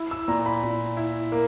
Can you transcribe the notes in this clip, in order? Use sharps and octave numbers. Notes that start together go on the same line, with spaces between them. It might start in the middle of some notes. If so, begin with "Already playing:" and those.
Already playing: E4 E6
E6
A#2 A#5
B5
A#2
E4
A#3